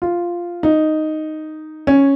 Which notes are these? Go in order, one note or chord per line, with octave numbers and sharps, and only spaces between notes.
F4
D#4
C#4